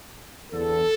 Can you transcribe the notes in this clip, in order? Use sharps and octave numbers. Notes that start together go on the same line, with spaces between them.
E2 D3 A4